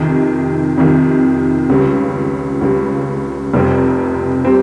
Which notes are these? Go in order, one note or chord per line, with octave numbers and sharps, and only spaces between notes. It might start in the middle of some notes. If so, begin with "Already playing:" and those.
Already playing: F2 C3 D#3
F2 C3 D#3
C#2 C#3 G3
C#2 C#3 G3
F1 F2 C3 G3 C4
C3 G3 C4